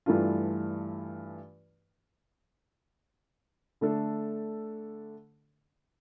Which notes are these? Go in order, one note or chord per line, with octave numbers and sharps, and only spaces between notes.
G2 E3 A3 D4 F4
D3 A3 D4 A4